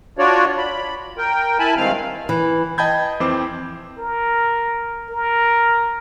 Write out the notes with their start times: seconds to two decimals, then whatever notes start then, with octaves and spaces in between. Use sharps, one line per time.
0.18 D4 F4 F#4 C#5 D5
0.57 B5
1.18 A#4 G5
1.59 E4 G#5 A5 B5
1.77 G2 D#3 G#3 C4 F5 F6
2.29 E3
2.78 D#5 G5 A5 B5 G6 G#6
3.20 F2 E3 C4 C5 D6
3.98 A#4
5.10 A#4